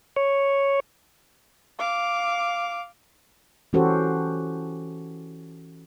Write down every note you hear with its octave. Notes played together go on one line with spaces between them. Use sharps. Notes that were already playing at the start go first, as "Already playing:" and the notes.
C#5
F5 D6
E3 C#4 F#4 G4 A4 C5